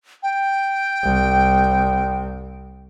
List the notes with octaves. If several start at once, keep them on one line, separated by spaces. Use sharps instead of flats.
G5
C2